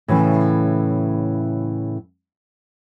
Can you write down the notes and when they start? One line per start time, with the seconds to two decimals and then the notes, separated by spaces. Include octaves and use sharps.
0.08 A2 C#3 E3